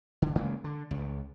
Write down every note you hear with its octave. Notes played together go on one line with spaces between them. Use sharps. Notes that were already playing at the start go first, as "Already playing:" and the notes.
D3
C#3 G#3 A#3
D3
C#2